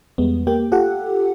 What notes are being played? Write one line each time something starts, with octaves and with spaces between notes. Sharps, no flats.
E2 G3 G#3 B3
A#3 G4 G5
F4 G4 A4 F#5